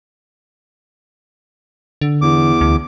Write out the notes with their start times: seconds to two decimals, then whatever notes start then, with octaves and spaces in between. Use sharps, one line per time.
2.01 D3
2.22 E2 D6
2.61 D2